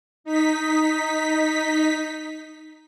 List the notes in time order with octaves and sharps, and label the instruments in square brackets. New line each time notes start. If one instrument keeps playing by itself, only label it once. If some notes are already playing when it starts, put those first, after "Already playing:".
[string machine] D#4 B6